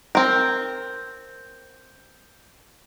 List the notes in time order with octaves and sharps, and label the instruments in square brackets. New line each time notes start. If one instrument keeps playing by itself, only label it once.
[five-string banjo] C4 A#4